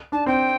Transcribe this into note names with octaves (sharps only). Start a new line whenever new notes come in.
D4 A5
C4 G5